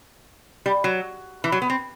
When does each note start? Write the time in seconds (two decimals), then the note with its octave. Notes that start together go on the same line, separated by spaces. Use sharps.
0.66 G3
0.84 F#3
1.44 E3
1.52 F#3
1.62 B3
1.70 C4